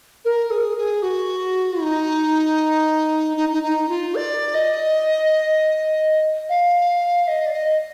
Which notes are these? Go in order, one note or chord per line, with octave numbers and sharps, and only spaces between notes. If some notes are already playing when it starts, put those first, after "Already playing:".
A#4
G#4
G#4
F#4
D#4
D#4
D#4
D#4
F4
D5
D#5
F5
D#5
D5
D#5